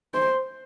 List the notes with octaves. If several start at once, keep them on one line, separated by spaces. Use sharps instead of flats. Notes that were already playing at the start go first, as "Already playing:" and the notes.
C5